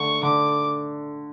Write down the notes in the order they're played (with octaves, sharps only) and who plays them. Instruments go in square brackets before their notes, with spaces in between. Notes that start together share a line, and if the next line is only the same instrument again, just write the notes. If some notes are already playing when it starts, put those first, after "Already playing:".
Already playing: [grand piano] D3 A3 [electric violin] C#6
[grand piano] D3 [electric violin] D6